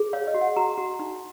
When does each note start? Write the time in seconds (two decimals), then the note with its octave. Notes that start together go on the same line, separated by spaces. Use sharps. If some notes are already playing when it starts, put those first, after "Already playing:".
Already playing: G#4
0.13 C#5 F5
0.27 D#5
0.34 F#4
0.41 F#5
0.56 F#4 A#5
0.77 F#4
0.99 D#4